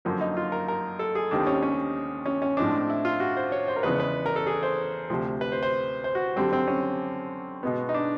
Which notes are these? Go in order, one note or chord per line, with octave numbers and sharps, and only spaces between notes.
F#2 D3 F3 A#3
D#4
F4
A#4
A#4
A4
G#4
D#2 D#3 G3 C4 D4
C#4
C#4
C#4
C#4
A2 F3 G#3 C4 D4
E4
F4
F#4
C5
C#5
C5
A#4
E2 C#3 F3 G#3 B3 B4
B4
A#4
A4
G#4
C5
D2 C3 F3
B4
C5
C5
C5
F#4
F#2 D3 G3 C4
C4
C#4
B2 G#3 B3
D#4
D4